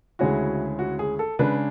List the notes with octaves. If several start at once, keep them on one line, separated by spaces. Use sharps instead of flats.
D2 C#3 G#3 C#4 E4 F#4
F#4
G#4
A4
C#3 G#3 D4 B4